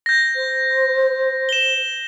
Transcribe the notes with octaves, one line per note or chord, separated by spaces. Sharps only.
G6 A#6
C5
E7 G7